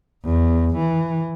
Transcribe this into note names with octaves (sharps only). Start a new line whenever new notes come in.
E2
E3